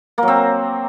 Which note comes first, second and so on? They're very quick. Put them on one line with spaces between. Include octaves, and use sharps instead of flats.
A#3 F#3 C4